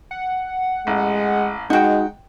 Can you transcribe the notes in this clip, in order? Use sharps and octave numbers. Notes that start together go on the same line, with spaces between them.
F#5
A1 G#3
G#3 D#4 F#4 F#5 G5